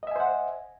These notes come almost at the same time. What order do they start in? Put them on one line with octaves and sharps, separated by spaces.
D#5 E5 G#5 C5 F#5